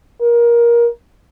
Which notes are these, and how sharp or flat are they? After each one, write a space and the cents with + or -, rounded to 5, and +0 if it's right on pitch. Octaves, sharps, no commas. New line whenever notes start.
A#4 +20